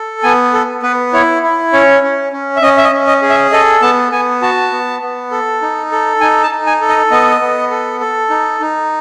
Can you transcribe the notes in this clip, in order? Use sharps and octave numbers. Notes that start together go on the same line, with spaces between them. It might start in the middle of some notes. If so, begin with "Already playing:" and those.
Already playing: A4
B3 G#5
A4
B3 B4
E4 C#5
E4
C#4 C#5
C#4
C#4
E5
C#4 D#5
E5
D#5
C#4
D#5
G#4
E5
A4 D#5
B3 A5
B3 G#5
F#4 A5
B3
B3
A4
D#4
A4
D#4 G#5
A5
D#4
G#5
A4
D#5
B3 D#5
B3
A4
A4
D#4
D#4